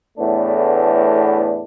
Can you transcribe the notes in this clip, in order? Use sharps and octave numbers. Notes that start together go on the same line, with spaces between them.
E2 A2 A3 B3 D4